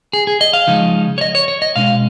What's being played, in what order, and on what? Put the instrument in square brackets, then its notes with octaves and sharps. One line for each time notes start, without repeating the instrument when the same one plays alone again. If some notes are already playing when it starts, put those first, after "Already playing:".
[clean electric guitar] G#4
G#4
D#5
F5
C#3 F3 G#3 D#4
C#5
D#5
C#5
C#5
D#5
B2 G#3 C#4 F5